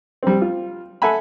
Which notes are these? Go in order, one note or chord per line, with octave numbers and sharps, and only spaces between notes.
G3 C4
F4
A4 E5 F#5 G#5 B5